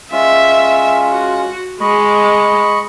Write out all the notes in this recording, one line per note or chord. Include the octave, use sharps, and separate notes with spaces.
G#3 C#4 F4 E5
F#4
G#3 D#5 B5 C#6